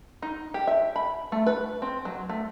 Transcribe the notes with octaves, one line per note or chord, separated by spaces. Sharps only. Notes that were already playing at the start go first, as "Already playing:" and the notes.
D#4
G4
E5
B5
A3
B4
C4
F#3
A3